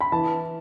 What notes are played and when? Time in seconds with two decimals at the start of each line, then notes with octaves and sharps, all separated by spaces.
0.01 B5
0.12 E3 A5